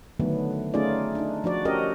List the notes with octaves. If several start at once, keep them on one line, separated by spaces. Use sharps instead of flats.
D3 D#3 F#3 A3 B3 D4
A3 C#4 D#4 F4 G#4 D5
D4 D#4
F3 D4 F#4 D5
C#4 F#4 G4 A#4 D#5